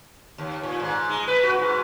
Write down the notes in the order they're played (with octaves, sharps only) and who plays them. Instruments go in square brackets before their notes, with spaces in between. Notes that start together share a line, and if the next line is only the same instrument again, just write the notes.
[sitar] D#2
A#2
G#2
G#3
B4
F#4
G#2